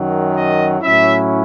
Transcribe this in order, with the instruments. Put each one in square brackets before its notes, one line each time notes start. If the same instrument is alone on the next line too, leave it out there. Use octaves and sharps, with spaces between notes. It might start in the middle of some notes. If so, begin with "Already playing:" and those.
Already playing: [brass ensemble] F#2 D#3 F#3
D#5
A2 F#3 C#4 E4 E5